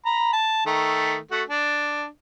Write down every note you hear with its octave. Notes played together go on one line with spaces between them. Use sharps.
A#5 B5
A5
D#3 A3
A3 F#4
D4